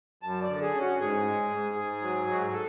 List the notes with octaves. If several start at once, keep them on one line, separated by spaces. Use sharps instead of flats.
F#2 A5
D5
D3
G#4
C#4
F#4
G#2 G#4
G#3
G#2
G#2
F#3
G#2 F#4
G#4
A4